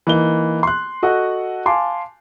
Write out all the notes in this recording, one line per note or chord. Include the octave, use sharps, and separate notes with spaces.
E3 A#3 D#4 G7
C6 F#6
F#4 A4 D#5 F#5
F5 G#5 A5 C6 D6